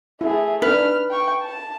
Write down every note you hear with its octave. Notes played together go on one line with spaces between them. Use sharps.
A3 E4 G#4
D4 D#4 B4 F6
G5 C#6
A5